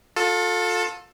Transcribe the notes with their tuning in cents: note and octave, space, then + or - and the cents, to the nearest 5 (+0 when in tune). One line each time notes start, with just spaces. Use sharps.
F4 +35 A4 +5